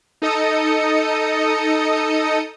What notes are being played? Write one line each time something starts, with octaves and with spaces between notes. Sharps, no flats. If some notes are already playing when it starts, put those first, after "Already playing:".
D#4 A4 D#5 D#6 C#7